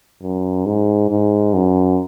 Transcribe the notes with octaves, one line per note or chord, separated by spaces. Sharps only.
F#2
G#2
G#2
F#2